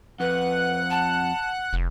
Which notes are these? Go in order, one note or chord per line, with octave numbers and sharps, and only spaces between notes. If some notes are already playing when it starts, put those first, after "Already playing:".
F2 B4 F#5 F#6
A5
F1